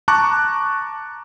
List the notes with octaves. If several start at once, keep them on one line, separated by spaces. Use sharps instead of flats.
A5 A#5 C#6 D6 F#6